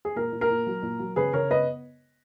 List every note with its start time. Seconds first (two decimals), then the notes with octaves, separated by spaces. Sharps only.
0.05 G#4
0.16 A#2 A#4
0.32 A#2
0.41 A#4
0.50 A#2
0.66 F#3
0.82 A#2
0.99 F#3
1.16 C#3 G#4 B4
1.33 C#3 A#4 C#5
1.50 B3 B4 D#5